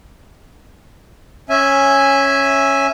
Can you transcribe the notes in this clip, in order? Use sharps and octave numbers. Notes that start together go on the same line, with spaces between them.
C#4 E5 G#5